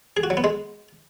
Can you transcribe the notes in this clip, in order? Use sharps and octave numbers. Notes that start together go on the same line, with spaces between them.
G#4
F#4
F#3
B3
G#3